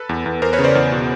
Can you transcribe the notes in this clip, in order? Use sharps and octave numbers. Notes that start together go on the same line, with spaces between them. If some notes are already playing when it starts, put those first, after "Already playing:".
Already playing: A4 B4
E2
E2
E2 A#4 C5
B4 C#5
C#3
C5 D5
E2
B2